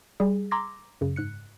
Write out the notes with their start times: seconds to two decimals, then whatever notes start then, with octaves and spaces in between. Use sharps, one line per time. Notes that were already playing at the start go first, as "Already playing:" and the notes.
0.20 G3 G#4
0.51 A#5 C6 D6 E6 G#6 A#6
1.01 F#2 C#3
1.16 G#2 F#6 C#7